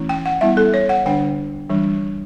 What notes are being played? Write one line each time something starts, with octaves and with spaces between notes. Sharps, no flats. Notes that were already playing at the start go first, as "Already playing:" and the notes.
Already playing: E3 A3 C#4 E4
G5
F#5
G3 B3 E4 E5
A4
C#5
F#5
D3 G3 D4 G5
E3 G3 D4